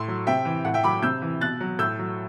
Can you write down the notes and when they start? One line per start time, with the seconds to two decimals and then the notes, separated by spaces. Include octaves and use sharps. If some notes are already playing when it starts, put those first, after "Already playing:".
Already playing: A2 C6 E6
0.08 F#3
0.27 C3 E5 G5
0.45 E3
0.65 A2 F#5
0.74 E5 G5
0.84 F#3 B5 D6
1.02 C3 E6 G6
1.22 E3
1.41 B2 F#6 A6
1.60 F#3
1.79 A2 E6 G6
1.99 F#3